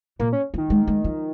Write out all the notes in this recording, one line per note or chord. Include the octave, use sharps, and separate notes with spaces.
A#2 A#3
C#4
D#3 F3
G#3
G#3
F3